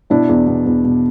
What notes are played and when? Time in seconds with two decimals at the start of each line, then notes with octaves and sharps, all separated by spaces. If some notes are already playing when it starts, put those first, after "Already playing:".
0.10 B2 D4 E4
0.29 E2
0.47 B2
0.66 E2
0.84 B2